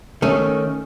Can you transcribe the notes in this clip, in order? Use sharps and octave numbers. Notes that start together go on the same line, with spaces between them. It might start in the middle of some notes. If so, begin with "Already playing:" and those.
D#3 A3 C#4